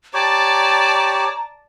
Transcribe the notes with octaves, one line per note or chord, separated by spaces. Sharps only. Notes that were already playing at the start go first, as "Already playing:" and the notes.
G4 C#5 D5 A5 A#5 D6